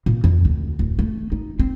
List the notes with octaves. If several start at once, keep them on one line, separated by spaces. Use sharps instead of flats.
A#2
F2
D2
D1
A3
D#4
C4